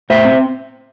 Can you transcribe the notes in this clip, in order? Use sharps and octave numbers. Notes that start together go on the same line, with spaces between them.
A2 C5 E5
C4